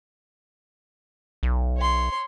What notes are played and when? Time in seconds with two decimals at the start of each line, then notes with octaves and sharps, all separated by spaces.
1.43 B1
1.77 C#5 C6